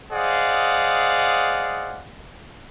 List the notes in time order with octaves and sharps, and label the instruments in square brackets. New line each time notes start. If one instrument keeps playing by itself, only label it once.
[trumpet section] G#4 C5 D5 D#5 F5 F#5